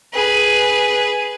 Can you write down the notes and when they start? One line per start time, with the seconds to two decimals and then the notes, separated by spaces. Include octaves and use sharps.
0.13 G#4 B4